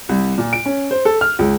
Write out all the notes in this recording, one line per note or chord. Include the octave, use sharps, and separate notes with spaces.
C2
A#2
D7
C#4
C5
A4
F6
C#2